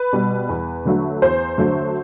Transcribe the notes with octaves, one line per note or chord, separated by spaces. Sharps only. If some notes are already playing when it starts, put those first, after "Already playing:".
Already playing: B4
B2 G3
E2
D3 F#3 A3
E2 C5
D3 F#3 A3